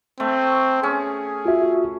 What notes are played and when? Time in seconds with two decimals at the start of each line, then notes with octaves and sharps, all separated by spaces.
0.20 A3 C4
0.83 C#4 G#4
1.45 F4 F#4 E5